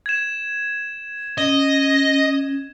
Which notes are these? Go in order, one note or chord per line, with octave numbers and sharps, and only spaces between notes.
G#6 E7
C#4 D#5